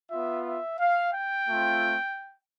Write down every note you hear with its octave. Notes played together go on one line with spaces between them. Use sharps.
B3 F4 E5
E5
F5
G5
A3 C4 F4